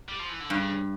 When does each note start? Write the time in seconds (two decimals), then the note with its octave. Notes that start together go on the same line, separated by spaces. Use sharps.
0.08 G3
0.19 F3
0.29 E3
0.40 D3
0.49 G2 C#3